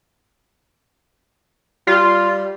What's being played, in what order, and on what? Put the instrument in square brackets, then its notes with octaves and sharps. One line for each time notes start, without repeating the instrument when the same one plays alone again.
[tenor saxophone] G3 [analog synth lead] F4